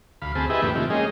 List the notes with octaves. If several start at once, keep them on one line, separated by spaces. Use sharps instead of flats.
D2 F5 B5
D2 C4 G#4 A5 B5
E4 G4 G#4 B4 D#5 E5
F2 A#2 D3 A3 G4 B4
A2 C3 D#3 F3 E4 G4
G#3 A#3 C#4 D#4 G#4 D#5